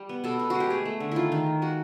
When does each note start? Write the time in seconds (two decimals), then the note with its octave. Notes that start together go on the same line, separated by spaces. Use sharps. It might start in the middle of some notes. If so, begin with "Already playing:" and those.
Already playing: G3
0.09 B3
0.24 B2 A4
0.39 B2
0.50 G#3 F#4
0.60 G4
0.70 A3 G#4
0.85 A3
1.00 D3
1.12 D#3 E4 F4
1.32 D#3
1.46 A#3
1.62 G#3 F#4